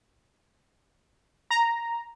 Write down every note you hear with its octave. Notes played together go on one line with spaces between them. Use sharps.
A#5